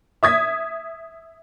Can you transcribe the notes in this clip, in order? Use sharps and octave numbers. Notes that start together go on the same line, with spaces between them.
E5 D#6 G#6 B6